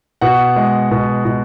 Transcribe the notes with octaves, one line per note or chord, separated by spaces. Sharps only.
B2 F#4 F#5
G#3
B2
B2